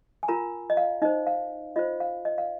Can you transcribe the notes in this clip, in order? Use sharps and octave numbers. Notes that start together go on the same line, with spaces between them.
G#5
F4 A#4 A#5
D#5
F5
D#4 C5 D#5
F5
F4 C5 D#5
F5
D#5
F5